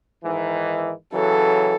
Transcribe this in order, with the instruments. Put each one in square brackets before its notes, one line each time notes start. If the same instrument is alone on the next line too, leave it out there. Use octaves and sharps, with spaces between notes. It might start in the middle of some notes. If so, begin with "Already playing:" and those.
[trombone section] G#2 D#3 E3
[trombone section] C#3 E3 F#3 [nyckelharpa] A4